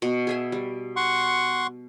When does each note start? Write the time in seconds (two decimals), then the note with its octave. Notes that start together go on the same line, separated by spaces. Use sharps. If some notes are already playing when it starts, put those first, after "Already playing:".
0.02 B2
0.27 G#4 E5 G#5
0.52 G3
0.96 F#5 C6 C#6